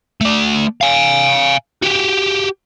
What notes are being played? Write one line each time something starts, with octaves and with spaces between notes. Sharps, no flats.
A3 D5
F5 G#5
F#4 G4